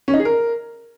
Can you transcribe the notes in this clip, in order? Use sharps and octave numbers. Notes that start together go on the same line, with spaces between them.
C#4
D#4
G#4
A#4